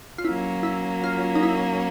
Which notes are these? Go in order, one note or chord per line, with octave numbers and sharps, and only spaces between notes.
F4
F#3 A#3 C#4 E4
E4
F4
D#4
E4